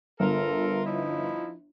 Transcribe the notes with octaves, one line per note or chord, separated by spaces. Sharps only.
G1 F4 A4 A#4
F3 D#4 E4